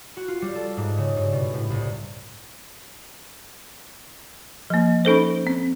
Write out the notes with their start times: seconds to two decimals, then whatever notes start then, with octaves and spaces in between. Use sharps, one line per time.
0.17 F#4
0.28 F4
0.42 G3
0.55 A4
0.77 G#2
0.98 C#3
1.16 G2
1.32 B2
1.53 A2
1.70 C2
4.70 F3 A#3
5.05 C#4 D#4 A4 C5
5.47 C4